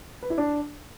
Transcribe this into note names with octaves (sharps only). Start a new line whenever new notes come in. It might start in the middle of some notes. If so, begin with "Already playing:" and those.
B4
E4
D4